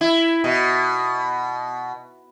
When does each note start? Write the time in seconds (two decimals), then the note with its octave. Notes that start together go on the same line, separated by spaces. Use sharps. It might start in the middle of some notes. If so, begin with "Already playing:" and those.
0.01 E4
0.44 B2